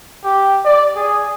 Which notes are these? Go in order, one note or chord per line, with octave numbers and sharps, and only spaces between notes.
G4
D5
G#4